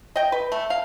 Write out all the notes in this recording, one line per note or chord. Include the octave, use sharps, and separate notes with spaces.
D#5 G5
B4
A3
F5